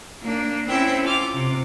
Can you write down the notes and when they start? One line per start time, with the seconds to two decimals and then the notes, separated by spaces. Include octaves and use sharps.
0.21 A#3 D4
0.68 C4 C#4 E4 E5 G5
1.04 F4 D6 F6
1.34 C3